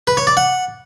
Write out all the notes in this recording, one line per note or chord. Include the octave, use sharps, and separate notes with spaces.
B4
C#5
D5
F#5